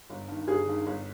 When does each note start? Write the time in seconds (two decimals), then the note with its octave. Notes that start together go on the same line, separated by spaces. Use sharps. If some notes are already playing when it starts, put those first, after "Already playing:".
0.10 G1
0.28 G2 D#3
0.47 G1 G#4
0.67 G2 D#3
0.86 G1